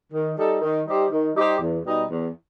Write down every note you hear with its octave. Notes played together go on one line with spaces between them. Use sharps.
D#3
G3 D#4 A4
D#3
G3 D#4 G4 C5
D#3
G3 D#4 G4 C5
E2
B2 G3 D#4
E2